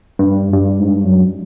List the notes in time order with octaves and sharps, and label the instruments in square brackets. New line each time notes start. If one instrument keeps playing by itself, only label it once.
[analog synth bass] G2
G2
G#2
G2
F#2